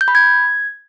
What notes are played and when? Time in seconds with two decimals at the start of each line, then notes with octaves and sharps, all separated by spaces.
0.01 G6
0.08 B5
0.15 G#6